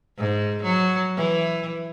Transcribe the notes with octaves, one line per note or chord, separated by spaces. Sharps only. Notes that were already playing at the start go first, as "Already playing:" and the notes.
G#2
F#3
E3